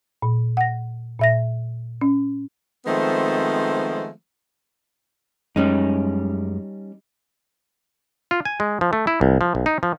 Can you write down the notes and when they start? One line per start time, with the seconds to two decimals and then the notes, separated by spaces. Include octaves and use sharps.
0.22 A#2
0.57 F#5 A#6
1.19 A#2 E5 A#6
2.01 C#4
2.86 D#3 F3 G#3 A3 B3 C4
5.56 F#2 G3 G#3 C#4 D#4
8.31 F4
8.45 G#5
8.60 G#3
8.81 F3
8.93 A3
9.07 E4
9.21 C2
9.41 F3
9.55 B1
9.66 D#4
9.83 F3